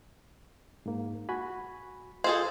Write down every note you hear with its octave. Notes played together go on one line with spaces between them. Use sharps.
G#2 A#3
F#4 G#5 B5
F4 G#4 A4 C5 D#5